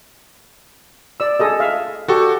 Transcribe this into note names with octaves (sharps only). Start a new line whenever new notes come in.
D5 E6
G#4 A4 D#5
E5 F5
F#4 G4 A4 C#6